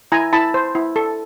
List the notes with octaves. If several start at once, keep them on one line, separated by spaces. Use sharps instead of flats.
E4 G#5 A#5
E4 A5 B5
C5
E4
A4